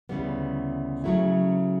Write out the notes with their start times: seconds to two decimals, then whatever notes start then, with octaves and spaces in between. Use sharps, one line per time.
0.09 D2 C#3 E3 G3 B3
1.04 C#3 F#3 A3 E4